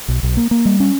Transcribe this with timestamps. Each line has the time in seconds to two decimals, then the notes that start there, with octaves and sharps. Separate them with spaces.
0.08 B1
0.23 B1
0.37 A#3
0.51 A#3
0.65 G3
0.80 C#4